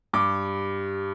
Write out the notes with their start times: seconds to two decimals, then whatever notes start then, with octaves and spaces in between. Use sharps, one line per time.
0.13 G2 D6